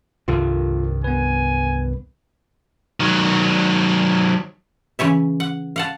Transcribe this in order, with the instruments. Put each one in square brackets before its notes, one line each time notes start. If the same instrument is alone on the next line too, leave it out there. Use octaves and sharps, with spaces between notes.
[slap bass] C2 G2 D#3 [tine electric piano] F4 A4
[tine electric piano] B3 B4 [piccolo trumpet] G#5
[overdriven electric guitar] D#3 F#3
[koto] C#3 E3 C#5 E5
F#5
F5 F#5 A5